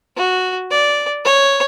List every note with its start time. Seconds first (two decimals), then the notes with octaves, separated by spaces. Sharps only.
0.17 F#4
0.71 D5
1.25 C#5